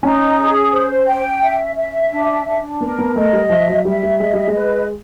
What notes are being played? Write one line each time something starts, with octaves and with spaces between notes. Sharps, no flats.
C#4 D#4
G#4
C5
G5
E5
E5
D4
D4
B3 A#4
B3
A3 D#5
G3
F3 E5
F#3
G3 E5
G3
G#3 D#5
G3
G#3
B4